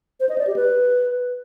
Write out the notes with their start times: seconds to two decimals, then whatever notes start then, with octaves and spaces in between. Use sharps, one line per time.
0.20 C5
0.29 D#5
0.38 D5
0.47 G4
0.56 B4